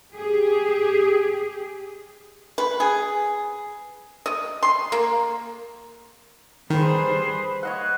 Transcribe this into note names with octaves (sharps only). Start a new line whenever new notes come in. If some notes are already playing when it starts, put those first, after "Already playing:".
G4 G#4
B4
G#4
D#5
C6
A#3
D#3 G3 G#4 B4 C5 B5
C#5 D#5 F#5